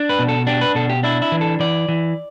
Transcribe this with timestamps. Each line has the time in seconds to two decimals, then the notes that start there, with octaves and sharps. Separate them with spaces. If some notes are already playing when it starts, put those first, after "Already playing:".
Already playing: D4
0.09 B4
0.19 B2
0.29 A4
0.47 D4 G4
0.61 B4
0.75 B2 A4
0.90 G4
1.03 D4 E4
1.22 E4
1.32 E3
1.41 A4
1.60 E3 D5
1.89 E3